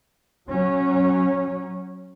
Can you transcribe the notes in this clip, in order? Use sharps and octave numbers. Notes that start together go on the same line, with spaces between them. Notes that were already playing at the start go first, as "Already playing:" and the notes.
F#3 C#4